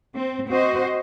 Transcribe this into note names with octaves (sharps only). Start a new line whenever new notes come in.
C4
C4 F#4 C5 D#5